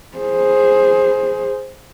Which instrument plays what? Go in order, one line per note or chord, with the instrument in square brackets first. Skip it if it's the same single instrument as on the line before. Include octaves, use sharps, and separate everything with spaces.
[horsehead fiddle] G#4 C5